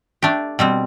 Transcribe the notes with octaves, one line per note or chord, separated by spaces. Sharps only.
A3 D4 G4
B2 G3 C4